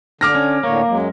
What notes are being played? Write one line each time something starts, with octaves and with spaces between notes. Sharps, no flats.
D3 D6 F6 A#6
C#4
A2 D3 A#3 C#5
F#2 F#3 G#3